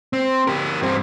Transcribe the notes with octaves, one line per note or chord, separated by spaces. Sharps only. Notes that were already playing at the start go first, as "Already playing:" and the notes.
C4
G4 A#4
G2 C4